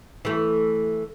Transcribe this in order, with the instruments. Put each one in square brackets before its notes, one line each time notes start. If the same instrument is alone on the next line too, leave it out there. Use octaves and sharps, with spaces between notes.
[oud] E3 A3